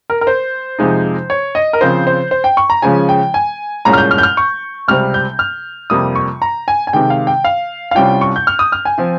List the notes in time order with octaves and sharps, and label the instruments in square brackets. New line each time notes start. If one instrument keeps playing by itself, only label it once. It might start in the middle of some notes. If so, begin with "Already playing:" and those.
[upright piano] A#4
A#4
C5
F2 C3 F3 G#3 D#4
C#5
D#5
A#4
C#3 F3 C4 C5
C5
C5
G5
C#6
A#5
C#3 F3 G#3 C#4 G#5
G5
G#5
C2 A#2 G#3 C#4 A#5
F6
G6
F6
G6
F6
C#6
C#2 C3 G3 C4 F6
G6
F6
F2 C3 G3 A#3 D#6
C#6
A#5
G#5
G#5
C3 D#3 G#3 G5
F5
G5
F5
F5
C2 C3 G3 C#4 F4 G5
C#6
G6
F6
D#6
F6
G#5
F3 C4 F4